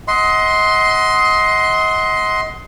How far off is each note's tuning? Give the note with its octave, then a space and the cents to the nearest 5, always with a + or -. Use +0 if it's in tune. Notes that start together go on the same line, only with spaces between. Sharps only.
D#5 +30 F#5 +0 C6 +0